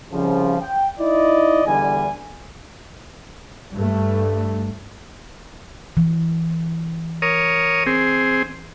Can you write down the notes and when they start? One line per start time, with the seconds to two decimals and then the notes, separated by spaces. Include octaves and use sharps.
0.13 C2 C#3 F3
0.60 G5
0.99 D#4 E4 D5 D#5
1.67 E2 D3 G3 G#5
3.74 G2 A3
5.97 E3
7.22 A#4 C#5 D#6
7.87 C4 G#4